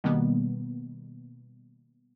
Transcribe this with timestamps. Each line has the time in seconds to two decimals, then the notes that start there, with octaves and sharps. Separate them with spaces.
0.04 B2 D#3 G3 A#3 B3